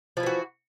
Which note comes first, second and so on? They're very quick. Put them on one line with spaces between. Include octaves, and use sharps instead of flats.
F3 E4 E3 F#4